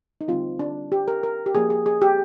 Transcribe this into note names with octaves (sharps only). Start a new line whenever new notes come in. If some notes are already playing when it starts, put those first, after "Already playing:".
D#4
D3 G3 C4 F4
D4
G4
A#4
A#4
G4
F3 A#3 G#4
G#4
G#4
G4